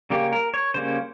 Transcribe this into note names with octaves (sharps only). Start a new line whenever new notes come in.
C#3 G3 A#3 C#4 G4
A#4
C#5
C#3 G3 A#3 C#4 C5